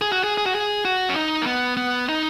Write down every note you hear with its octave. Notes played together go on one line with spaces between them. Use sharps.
G#4
F#4
G#4
G#4
F#4
G#4
F#4
C#4
D#4
A#3
B3
B3
D#4